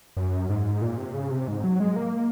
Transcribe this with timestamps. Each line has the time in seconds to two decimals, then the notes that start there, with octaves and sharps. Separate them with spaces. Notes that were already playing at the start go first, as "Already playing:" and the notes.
0.17 F#2
0.49 G#2
0.82 A#2
0.98 C3
1.14 C#3
1.30 C3
1.48 G#2
1.64 F#3
1.80 G#3
1.96 A#3